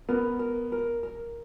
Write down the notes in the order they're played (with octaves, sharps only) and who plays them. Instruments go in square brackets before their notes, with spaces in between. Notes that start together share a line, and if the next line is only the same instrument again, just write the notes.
[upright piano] B3 [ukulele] A#4
[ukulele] A#4
A#4
A#4